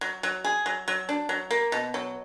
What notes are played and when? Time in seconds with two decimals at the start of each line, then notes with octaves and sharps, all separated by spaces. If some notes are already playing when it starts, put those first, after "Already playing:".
0.01 F#3
0.23 F#3
0.44 G#4
0.66 F#3
0.88 F#3
1.09 D4
1.29 F#3
1.51 A#3
1.72 B2
1.94 F#3